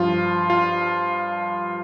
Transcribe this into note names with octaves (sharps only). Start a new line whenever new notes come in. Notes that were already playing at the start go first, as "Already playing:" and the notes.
Already playing: G2 F3 F4
F4